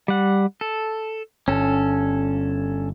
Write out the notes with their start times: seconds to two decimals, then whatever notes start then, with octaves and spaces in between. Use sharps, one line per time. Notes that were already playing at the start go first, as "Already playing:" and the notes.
0.08 G3 F#5
0.61 A4
1.48 G1 C#4 A4